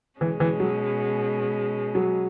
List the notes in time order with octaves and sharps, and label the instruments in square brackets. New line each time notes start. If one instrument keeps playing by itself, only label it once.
[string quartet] B2 G#3 C#4 [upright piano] E3
[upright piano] E3
F#3
F#3